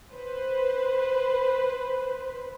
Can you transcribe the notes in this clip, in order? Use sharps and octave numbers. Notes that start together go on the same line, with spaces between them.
B4 C5